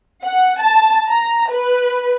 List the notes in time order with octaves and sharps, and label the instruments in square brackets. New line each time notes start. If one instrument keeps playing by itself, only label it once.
[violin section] F#5
A5
A#5
B4